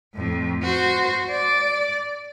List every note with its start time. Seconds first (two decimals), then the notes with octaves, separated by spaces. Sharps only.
0.15 F2 A2
0.62 F#4 C5
1.31 D5